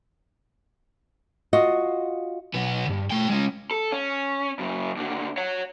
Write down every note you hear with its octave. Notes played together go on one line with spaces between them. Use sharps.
F4 F#4 D#5
B1 B3
D2 G2
A3 G5
G#3 C#4
A4
C#4
F#2 C#3
D#2 D3
C#5 F#5